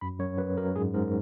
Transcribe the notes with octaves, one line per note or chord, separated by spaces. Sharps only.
F#2 B5
F#2 C#5
F#2 B4
F#2 A#4
G#2 G#4
G#2 A#4